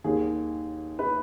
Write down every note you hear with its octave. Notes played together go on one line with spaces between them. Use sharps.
D#2 D#3 F#3 G#4
B4